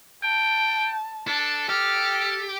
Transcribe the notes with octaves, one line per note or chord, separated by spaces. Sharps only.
G5 A5
D4 A4
G4 A4 F6